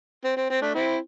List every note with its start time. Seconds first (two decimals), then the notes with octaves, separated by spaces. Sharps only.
0.25 C4
0.37 C4
0.50 C4
0.62 A3 D4
0.75 C4 E4